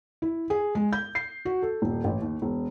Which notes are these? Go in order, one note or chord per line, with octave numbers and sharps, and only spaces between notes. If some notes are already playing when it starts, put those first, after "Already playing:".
E4
G#4
G#3
G6
C7
F#4
A4
D#1
A1
D#2
E1